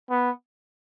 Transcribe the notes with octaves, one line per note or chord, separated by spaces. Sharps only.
B3